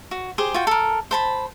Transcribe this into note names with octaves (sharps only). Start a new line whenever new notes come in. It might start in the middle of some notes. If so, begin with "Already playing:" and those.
F#4
G4 G#4 C5
F4 F#4 G5
A4 A#4
C5 A5 B5